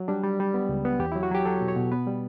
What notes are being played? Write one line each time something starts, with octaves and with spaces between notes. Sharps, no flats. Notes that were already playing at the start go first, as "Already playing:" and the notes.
Already playing: F#3
G3 D4
G3
G3
B3
C#2
B3
E2 G4
F#3 E4
F#4
F#3 G4
F#3 A4
B2
C#5
B2
B3 B4
G3